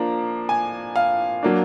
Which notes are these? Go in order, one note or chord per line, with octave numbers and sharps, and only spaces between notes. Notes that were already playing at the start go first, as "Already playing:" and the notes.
Already playing: F3 A#3 D4 A#5
G#5
F5
F#3 A#3 D4